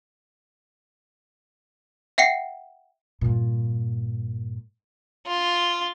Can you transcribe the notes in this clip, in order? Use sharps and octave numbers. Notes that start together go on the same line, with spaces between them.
E5 F#5 G5 C7 C#7
G2 A#2
F4